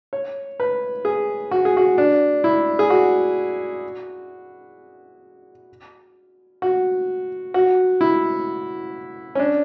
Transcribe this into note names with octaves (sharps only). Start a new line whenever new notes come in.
C#5
B4
G#4
F#4
G#4
F#4
D4
E4
G#4
F#4
F#4
F#4
E4
C#4
D4